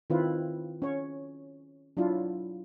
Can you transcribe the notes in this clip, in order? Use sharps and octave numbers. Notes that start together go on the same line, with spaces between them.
D#3 C4 E4 F4 B4
C#4 C#5
F#3 D4 E4 F4